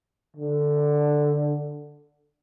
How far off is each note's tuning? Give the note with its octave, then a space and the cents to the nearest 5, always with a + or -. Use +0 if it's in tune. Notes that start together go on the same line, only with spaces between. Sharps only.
D3 +5